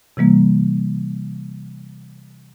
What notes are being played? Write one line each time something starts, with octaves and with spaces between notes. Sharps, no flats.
C3 E3 G3 A#3